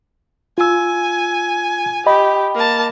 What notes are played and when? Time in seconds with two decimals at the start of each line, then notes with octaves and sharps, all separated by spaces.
0.58 F4 G#5 E6
2.07 G4 D#5 B5
2.55 A#3 A5